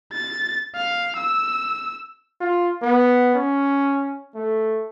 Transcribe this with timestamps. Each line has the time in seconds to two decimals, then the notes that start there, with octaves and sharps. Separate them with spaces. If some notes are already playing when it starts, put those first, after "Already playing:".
0.13 A6
0.75 F5
1.16 E6
2.41 F4
2.82 B3
3.35 C#4
4.35 A3